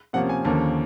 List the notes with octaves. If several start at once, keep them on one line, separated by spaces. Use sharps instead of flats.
C3 F3 A#3 C#4 F#5
G#5
D#2 D3 F3 A#3 C#4 A5